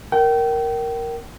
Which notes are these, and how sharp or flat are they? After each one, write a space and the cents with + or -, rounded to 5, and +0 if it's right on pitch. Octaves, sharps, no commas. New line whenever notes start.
A#4 +0 G5 -30